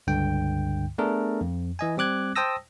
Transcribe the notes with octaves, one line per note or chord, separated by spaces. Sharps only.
C#2 G2 D3 G5
A3 B3 D4 G#4 A#4
F2
E3 D#5 G#5
G3 C4 D6 F#6 G#6
C5 G5 A5 D#6 E6 A#6